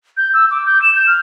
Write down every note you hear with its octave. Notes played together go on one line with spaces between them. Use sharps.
G6
E6
D6
G6
E7
G6
F6